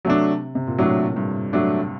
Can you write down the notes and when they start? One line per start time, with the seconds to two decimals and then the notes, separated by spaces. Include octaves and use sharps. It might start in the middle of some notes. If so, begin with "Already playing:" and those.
0.05 C3 F#3 A3 D4
0.55 C3
0.67 A#2
0.78 A2 F#3 A3 D4
1.16 G2
1.53 F#3 A3 D4